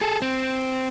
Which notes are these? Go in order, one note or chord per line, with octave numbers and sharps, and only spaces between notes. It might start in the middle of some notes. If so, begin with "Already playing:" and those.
G#4 A4
C4